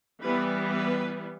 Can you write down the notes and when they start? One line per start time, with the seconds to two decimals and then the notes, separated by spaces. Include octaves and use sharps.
0.21 E3 G3 B3 B4
0.73 B4